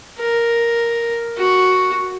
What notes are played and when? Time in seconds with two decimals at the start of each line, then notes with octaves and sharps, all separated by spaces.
0.19 A#4
1.38 F#4